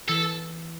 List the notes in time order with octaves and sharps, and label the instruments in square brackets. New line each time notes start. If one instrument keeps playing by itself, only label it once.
[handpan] E3 [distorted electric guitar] A4